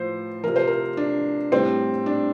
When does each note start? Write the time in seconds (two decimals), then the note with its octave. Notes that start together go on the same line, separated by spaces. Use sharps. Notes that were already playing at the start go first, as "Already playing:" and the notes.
Already playing: A2 F3 C5
0.44 C3 F3 A#4
0.56 C5
0.67 A#4
0.97 D4
1.52 A2 G3 C4
2.06 D4